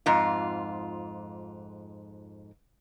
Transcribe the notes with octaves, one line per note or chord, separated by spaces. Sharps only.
F2 G#2 F4